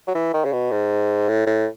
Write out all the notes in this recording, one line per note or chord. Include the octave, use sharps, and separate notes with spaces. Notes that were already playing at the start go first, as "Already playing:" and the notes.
F#3
E3
D#3
C#3
B2
G#2
A2
A2